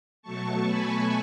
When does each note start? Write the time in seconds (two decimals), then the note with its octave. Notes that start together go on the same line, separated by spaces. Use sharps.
0.22 B2 F#3 A3 A5 C#6
0.65 G#5 B5